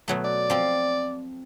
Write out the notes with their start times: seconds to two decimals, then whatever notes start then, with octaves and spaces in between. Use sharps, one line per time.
0.08 B2 F#3 A3
0.25 D5
0.50 F3 C4